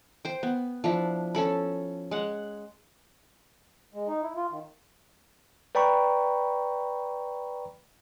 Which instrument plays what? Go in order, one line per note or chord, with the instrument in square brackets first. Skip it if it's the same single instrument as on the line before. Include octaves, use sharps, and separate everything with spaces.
[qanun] C5 G5
B3
F3 D4 E4
C#4 A4 B5
G#3 F#5
[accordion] G#3
D#4
E4
F4
D#3
[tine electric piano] B4 D5 G5 A#5 B5 C#6